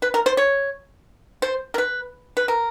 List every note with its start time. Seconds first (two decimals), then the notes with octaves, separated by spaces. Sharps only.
0.02 B4
0.14 A#4
0.26 C5
0.37 C#5
1.42 C5
1.74 A#4
1.78 B4
2.37 B4
2.48 A#4